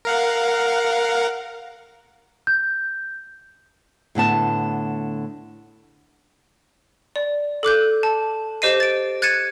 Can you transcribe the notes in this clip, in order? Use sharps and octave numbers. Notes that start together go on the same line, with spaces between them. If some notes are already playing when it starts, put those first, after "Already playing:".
A#4 F5 F#5
G6
A2 D3 B3 A5
D5
A4 D6 F#6 G6
A5
G4 C5 D#5 C7 D#7
A6 D7
F#6 G#6 A6 C#7 D#7 E7